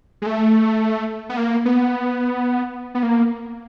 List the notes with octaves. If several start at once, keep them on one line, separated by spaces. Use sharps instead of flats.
G#3
A3
B3
A#3
B3
B3
A#3